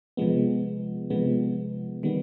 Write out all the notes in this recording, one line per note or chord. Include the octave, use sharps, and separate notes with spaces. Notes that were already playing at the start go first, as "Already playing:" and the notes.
C3 F3 G#3 B3
C3 F3 G#3 B3
D#3 G3 B3